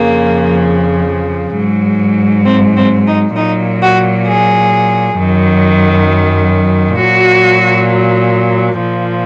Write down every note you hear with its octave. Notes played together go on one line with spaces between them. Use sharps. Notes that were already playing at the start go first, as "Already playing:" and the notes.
Already playing: F2 C#3 F3 A#3
G#2 F#3
C4
C4
D#4
A#2 F#3 D#4
F#4
G#4
F#2 D#3 F#3
A#2 F#3 F#4
A#2 F3